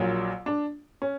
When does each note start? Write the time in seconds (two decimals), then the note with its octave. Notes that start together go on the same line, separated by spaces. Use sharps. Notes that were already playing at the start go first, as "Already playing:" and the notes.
Already playing: A#1 A#2 F#3
0.46 D4
1.02 C#4